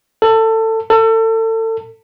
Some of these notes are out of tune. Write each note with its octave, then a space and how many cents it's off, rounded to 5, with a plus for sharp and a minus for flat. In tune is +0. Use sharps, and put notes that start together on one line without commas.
A4 +20
A4 +30